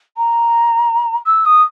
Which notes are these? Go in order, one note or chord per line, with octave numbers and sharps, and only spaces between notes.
A#5
E6
D#6